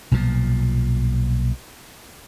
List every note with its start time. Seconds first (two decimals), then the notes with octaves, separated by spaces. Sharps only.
0.11 B1 A#2 D3 F3